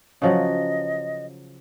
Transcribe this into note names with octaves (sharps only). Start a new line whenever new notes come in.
C#3 F3 F#3 D#5